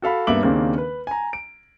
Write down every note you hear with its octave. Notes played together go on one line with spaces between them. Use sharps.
F#4 A4 F5 B5
G2 A#3 B3 E5 D6 F#7
D#2 C#3 A#3 C4 D4
B4
G#5 A#5
D7